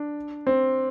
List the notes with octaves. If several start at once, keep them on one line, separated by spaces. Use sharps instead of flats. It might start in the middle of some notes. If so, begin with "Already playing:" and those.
Already playing: D4
C4